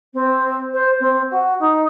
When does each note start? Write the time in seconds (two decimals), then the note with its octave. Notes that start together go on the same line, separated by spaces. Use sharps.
0.13 C4
0.73 C5
1.00 C4
1.30 F#4
1.59 D#4